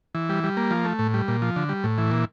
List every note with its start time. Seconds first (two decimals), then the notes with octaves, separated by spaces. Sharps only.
0.15 E3
0.29 G3
0.44 G3
0.57 A#3
0.71 F3
0.85 A3
0.99 A2
1.14 G3
1.28 A#2
1.42 F3
1.56 D3
1.69 G3
1.84 A2
1.98 E3
2.11 A#2